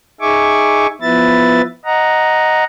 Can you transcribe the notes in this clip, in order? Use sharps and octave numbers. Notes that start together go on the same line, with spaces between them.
D#4 G#4 E5 G#5 C#6 D6
F3 B3 E4 B4 E5 A6
D#5 F#5 A#5